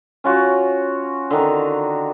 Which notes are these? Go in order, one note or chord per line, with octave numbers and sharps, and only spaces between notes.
C#4 F4 F#4
D3 D#3